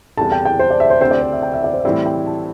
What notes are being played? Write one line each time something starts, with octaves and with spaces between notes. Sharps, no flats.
E2 C3 G3 E4 A4 A5
G5
G5
C5
D5
E5
C5
D2 D3 C4 G4 C5
D5
C5
E5
G5
E5
D5
C5
E5
A2 E3 G3 C4 E4 D5
G5
A5